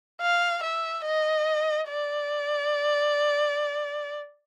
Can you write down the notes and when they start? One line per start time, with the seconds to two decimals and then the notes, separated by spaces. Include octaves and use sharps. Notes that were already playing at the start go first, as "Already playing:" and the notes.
0.22 F5
0.63 E5
1.06 D#5
1.89 D5